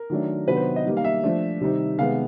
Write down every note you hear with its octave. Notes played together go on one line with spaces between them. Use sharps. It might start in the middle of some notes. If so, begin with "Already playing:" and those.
Already playing: A#4
D#3 F#3 A3 D4
C3 D#3 F#3 B3 D4 B4
C5
D#5
D#3 G3 A#3
F5
E5
F3 A3 D4
C3 D#3 G3 C4 D#4
C3 D#3 G#3 B3 F5